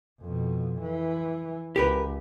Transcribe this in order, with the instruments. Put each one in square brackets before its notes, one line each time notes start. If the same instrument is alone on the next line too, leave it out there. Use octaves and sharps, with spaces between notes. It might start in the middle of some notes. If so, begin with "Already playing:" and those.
[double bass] F2 B2
E3
[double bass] C#2 [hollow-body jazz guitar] G4 A#4 B4